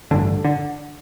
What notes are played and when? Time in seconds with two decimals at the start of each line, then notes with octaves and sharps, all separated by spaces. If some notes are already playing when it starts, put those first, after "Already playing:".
0.11 A1 G2 D3 D4
0.45 D3